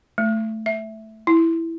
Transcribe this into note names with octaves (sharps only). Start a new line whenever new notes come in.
A3
E5
E4